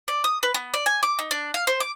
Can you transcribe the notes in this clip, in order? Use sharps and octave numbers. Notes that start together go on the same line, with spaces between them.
D5
D#6
B4
B3
D5
G#5
D6
D#4
D4
F5
C5
D6